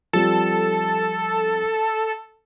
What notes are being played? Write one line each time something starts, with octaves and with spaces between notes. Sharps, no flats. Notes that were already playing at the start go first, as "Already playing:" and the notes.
F3 G3 C4 A4